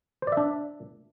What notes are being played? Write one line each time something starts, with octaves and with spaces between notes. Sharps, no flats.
D4 C5 D5 E5